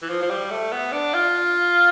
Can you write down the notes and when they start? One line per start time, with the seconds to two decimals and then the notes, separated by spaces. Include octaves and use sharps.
0.02 E3
0.09 F3
0.22 F3
0.30 G3
0.51 A3
0.72 B3
0.92 D4
1.14 F4